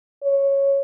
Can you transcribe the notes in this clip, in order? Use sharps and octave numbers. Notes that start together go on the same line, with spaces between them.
C#5